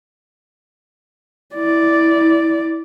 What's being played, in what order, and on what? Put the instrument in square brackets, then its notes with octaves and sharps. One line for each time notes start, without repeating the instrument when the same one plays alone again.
[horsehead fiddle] E4 D5